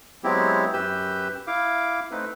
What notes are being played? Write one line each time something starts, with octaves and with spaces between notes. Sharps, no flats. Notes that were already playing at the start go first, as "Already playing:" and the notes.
F#3 G#3 B3 C4 E4 G4
F#2 G4 B4 E6 G6
E4 F5 D6
A3 C4 D#4 B4